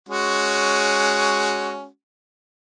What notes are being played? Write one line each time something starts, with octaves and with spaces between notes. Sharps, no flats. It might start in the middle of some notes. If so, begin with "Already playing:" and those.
G#3 C#4 F#4